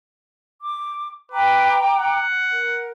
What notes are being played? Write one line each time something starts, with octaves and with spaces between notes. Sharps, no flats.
D6
B4 G5 A#5 D6
F#5
A#4